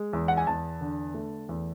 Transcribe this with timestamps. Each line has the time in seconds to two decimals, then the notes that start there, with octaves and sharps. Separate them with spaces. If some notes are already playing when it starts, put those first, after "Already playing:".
Already playing: G#3
0.13 E2
0.28 F#5
0.37 G#5
0.47 E2 A5
0.81 D3
1.14 A3
1.49 E2